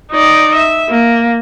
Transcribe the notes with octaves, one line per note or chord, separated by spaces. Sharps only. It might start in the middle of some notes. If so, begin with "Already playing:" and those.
D#4 D5
E5
A#3